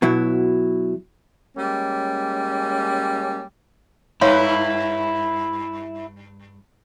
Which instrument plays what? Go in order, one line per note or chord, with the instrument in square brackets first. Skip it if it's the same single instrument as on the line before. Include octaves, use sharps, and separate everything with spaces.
[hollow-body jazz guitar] B2 F#3 E4
[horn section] G3 G#3 A#3 C#4
[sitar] G2 B4 [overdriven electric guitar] E4 [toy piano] C#5 F5 C6